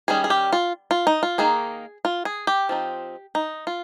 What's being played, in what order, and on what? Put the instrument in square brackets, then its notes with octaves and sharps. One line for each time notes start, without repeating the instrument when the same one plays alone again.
[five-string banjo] D#3 G3 C#4 G#4
G#4
G4
F4
F4
D#4
F4
D#3 A#3 D#4 G#4
F4
G#4
G4
F3 C4 D#4
D#4
F4